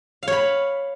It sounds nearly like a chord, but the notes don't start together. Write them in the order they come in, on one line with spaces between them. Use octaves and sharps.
F5 C#5 B5